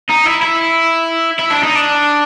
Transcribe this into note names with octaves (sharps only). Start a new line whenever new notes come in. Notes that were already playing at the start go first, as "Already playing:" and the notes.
D#4
E4
E4
E4
D4
D#4
D4